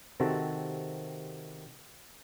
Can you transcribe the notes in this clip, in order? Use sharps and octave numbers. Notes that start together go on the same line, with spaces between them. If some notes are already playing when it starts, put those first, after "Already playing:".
C3 D#3 C4 F#4 A4